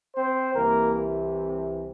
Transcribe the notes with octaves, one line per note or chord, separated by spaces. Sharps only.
C4 C5
C2 C3 E3 A#3 A#4